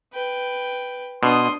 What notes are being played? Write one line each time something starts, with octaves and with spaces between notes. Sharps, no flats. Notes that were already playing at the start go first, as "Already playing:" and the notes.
B4 G5
B2 D4 C6 D#6